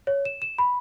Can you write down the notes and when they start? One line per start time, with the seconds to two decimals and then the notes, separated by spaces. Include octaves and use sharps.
0.07 C#5
0.25 E7
0.42 E7
0.58 B5